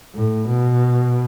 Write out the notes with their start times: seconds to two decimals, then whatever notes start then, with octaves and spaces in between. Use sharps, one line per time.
0.15 A2
0.49 B2